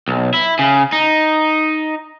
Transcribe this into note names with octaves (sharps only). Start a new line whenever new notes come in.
B1
E4
C#3
D#4